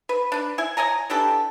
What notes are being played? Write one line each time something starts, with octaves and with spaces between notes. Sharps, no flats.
B4
D4 B4
E4 G#5
C#5 D#5 G#5 A#5
E3 D4 G4 A4